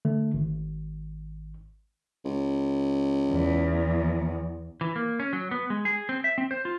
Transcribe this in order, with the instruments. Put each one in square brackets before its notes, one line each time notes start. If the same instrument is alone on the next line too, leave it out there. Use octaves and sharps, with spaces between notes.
[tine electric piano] D3 A3
G#1
[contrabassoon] C#2
[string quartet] E2
[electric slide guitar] E3
A#3
C#4
F#3
B3
G#3
G#4
C4
E5
C4
C5
F4